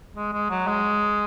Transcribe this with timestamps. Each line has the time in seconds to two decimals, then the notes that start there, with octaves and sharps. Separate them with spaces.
0.16 G#3
0.33 G#3
0.50 F#3
0.67 G#3